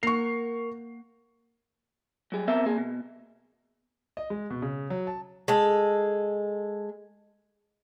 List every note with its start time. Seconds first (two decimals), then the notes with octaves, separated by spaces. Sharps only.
0.03 A#3 A#4 F#5 C#6 C7
2.32 F#3 G3 G#4
2.47 B3 C4 A#4 E5
2.66 A#3 G#4
2.78 B2
4.17 D#5
4.30 G#3
4.50 B2
4.62 C#3
4.90 F#3
5.07 A5
5.48 G#3 A4